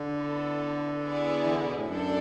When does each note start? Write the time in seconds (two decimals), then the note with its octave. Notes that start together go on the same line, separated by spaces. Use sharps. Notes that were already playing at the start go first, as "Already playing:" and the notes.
Already playing: D3
0.16 B3 E4 A4
1.01 B3 E4 G#4 D5
1.44 E3
1.54 D3
1.65 B2
1.76 A2
1.86 F#2 D4 A4 D5